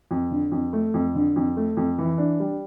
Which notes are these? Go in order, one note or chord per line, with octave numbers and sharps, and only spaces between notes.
F2
D3
F2
A3
F2
D3
F2
A3
F2
E3
D4
G3